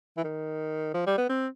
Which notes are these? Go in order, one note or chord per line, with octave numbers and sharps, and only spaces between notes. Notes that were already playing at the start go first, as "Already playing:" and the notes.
E3
D#3
F3
G3
B3
C4